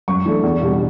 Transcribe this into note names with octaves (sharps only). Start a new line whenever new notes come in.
F#2 C#6
E3 A3 D4
E2
B2 G3 D4